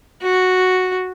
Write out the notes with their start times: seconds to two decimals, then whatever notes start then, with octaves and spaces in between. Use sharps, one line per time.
0.22 F#4